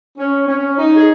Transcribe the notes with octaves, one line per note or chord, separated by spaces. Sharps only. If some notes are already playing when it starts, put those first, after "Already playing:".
C#4
C#4
D#4
G#4